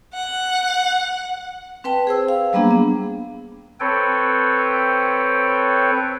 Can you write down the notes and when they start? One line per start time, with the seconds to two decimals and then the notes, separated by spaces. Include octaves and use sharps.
0.14 F#5
1.84 C4 B4 G5 A5
2.07 G#4 C5 E6
2.28 F5
2.53 F#3 G3 A#3 B3 D4 G#4
2.71 B3
3.80 C4 A4 B4 C#5 G5